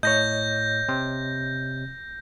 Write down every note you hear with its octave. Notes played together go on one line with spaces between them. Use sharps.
A2 C#5 D#5 G6 A#6
C3